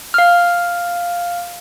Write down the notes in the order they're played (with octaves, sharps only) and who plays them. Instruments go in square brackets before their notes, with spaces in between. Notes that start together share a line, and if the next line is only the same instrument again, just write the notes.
[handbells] F5 F6